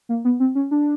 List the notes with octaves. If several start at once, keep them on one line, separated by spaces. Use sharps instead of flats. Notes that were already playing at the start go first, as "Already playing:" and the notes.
A#3
B3
C4
C#4
D4